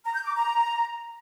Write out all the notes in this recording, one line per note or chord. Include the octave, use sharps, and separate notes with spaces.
A#5
G6
D6
A#5